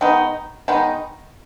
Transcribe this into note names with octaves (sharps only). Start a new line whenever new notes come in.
D#3 G#3 B3 D#4
D#3 G#3 B3 D#4